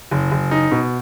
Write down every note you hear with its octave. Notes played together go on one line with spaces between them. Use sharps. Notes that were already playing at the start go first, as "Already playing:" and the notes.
F#1
F#1
D#4
B2